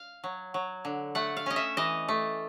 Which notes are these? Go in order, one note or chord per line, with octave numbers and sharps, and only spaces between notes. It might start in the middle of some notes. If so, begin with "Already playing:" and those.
Already playing: F5
F#3
F#3
D3
A3 F#5
F5
C#4 D#5
E5
E3 D#5
A3